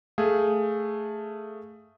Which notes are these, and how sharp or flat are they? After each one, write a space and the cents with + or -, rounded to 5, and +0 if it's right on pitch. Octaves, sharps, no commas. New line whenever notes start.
A3 +0 G#4 +0 F5 +0